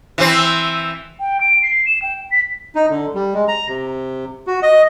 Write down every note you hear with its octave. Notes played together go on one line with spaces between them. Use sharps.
E3 C4
G5
D7
C7
E7
G5
B6
D#4
D3
G3
G#3
A#5
C3
F#4
D#5